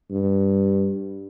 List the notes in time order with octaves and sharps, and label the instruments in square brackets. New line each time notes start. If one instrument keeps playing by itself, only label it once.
[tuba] G2